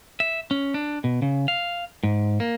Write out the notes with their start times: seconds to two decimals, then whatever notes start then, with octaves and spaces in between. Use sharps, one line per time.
0.20 E5
0.51 C#4
0.74 D4
1.04 B2
1.22 C#3
1.48 F5
2.03 G#2
2.40 A#3